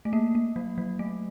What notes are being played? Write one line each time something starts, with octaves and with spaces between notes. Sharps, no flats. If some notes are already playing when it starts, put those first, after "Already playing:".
A3
A#3
A#3
F#3
F#3
A3